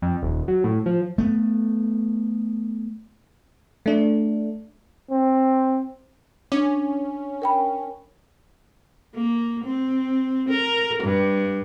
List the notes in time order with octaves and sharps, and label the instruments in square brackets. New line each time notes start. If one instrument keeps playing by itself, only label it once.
[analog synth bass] F2
D#1
F#3
A2
F3
[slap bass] A3 B3
[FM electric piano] A3 D4
[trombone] C4
[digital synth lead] C#4 [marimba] D4
[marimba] A#4 G5 B5
[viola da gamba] A#3
C4
A#4
G2